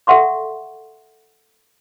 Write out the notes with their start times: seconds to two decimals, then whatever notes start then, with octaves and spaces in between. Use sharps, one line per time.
0.07 A4 E5 F#5 C6 C#6